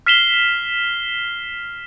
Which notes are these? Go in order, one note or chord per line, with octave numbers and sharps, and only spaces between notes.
F6 B6 C7 E7 F7 G7